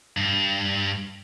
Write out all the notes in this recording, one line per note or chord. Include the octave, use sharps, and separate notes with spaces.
G2